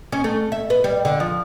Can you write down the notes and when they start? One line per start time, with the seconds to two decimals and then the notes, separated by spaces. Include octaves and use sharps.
0.12 C#4
0.24 A3
0.52 E5
0.70 B4
0.84 G3
1.05 D3
1.20 F3